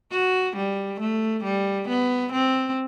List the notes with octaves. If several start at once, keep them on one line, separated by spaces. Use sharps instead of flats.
F#4
G3
A3
G3
B3
C4